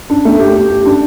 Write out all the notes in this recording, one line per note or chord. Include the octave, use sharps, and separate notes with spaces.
D4
A3
G4
G4
G4
D4